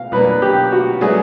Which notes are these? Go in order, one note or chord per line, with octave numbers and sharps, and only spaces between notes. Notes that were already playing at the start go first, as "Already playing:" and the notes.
Already playing: B2 F5
B2 F#3 A#3 D4 B4
G4
F#4
F#3 A3 D4 F#4 G#4 B4